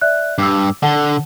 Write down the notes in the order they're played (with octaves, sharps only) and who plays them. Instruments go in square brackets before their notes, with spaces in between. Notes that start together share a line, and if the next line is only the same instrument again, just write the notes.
[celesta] D5 E5 F#6
[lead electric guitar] G2 [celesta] D6 E6
[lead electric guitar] D3 [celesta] F#5 A5 G7